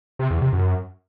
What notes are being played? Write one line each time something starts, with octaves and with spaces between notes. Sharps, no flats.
C3
E2
C3
F#2